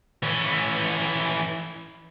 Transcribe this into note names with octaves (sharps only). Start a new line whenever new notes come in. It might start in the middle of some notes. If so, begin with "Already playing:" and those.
E3 C#4